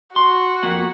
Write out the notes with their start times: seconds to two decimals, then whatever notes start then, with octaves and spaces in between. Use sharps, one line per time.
0.16 F#4 C6
0.63 F2 A#3 F#5